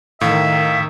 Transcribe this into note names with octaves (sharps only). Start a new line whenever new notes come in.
A2 D#3 E5 F5